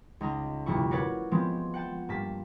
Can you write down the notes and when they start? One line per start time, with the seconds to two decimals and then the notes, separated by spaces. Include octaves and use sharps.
0.21 C#2 D#4 A#5
0.66 F1 D2 G2 E4 C#6
0.91 F#4 A#4 B4 C#5 D5 F#5
1.31 F3 G#3 B3 C4
1.74 F#5 G5 A5
2.09 G2 A#3 A5 B6